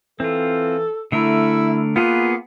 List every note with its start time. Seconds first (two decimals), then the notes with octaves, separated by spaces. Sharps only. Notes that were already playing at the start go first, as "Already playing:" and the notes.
0.20 E3 C4 F4 A4
1.12 D3 A3 E4 A#4 E5
1.96 A#3 B3 F4 G#4 B4